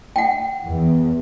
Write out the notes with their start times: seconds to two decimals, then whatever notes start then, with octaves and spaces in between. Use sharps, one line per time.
0.16 F#5 G5
0.64 E2